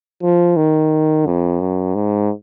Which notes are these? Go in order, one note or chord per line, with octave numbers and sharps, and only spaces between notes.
F3
D#3
F2
F#2
G#2